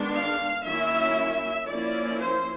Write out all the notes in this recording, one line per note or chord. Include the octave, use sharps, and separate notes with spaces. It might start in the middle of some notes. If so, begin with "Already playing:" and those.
Already playing: D#3 G#3 B3 D4
F5
D#3 F#3 A#3 C#4 E4 E5
F3 A#3 C#4 E4 D5
C5